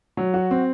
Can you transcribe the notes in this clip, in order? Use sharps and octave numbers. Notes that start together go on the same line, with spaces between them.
F#3
F#4
C4